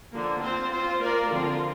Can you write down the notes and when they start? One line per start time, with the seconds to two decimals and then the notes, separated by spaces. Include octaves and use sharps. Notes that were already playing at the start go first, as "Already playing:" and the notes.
0.13 D3 F3 A#3
0.42 C4 F4 C5
0.71 C4 F4 C5
1.00 A#3 F4 A#4 D5
1.30 D3 F3 C4 F4